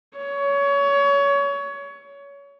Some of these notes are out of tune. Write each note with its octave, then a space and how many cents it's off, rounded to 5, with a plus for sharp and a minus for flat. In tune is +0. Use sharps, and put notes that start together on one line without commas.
C#5 +25